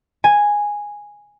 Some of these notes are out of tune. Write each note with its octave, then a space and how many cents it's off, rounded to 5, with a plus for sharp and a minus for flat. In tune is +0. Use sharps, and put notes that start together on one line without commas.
G#5 -5